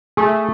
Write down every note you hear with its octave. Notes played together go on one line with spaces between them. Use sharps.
A3 G#4